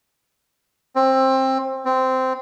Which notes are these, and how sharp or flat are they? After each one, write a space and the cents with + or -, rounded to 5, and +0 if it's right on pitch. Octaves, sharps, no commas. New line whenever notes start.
C4 +20
C4 -10